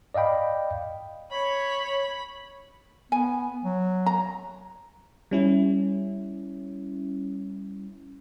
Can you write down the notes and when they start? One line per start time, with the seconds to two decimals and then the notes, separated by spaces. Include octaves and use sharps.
0.14 D5 D#5 F5 G5 B5
1.32 C#5 B5
3.12 B3 G#5
3.65 F#3
4.06 A#5
5.31 G3 C#4 E4